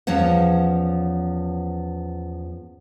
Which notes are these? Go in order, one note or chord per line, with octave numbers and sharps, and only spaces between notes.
E2 F3 C#4 C#5 F#5